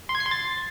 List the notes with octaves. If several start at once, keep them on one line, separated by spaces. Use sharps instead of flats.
C6
G#6
C7
C6
A6